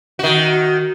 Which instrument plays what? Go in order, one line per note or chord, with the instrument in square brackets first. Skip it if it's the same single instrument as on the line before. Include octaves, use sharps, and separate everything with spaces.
[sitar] D#3 F#4